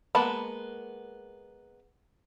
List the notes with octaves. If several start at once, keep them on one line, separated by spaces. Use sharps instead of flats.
G#3 A#3 B3 A5 B5